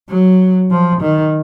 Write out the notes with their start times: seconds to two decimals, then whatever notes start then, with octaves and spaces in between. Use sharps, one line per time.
0.09 F#3
0.71 F3
1.01 D#3